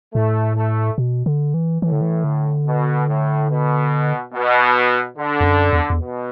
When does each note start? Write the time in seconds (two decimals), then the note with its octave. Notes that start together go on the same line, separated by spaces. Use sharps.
0.14 A2 A3
0.56 A3
0.98 B2
1.26 D3
1.54 E3
1.82 A2 E3
1.92 D3
2.01 E3
2.24 D3
2.67 B2
3.08 A2
3.50 B2
4.33 B2
5.17 D3
5.41 E2
5.45 F#2
5.73 E2
5.90 E2
6.01 B2